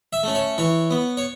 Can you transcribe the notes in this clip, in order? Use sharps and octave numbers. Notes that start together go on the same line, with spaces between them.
E5
A3 C#4
C#5
E3 C#5
B3
C#5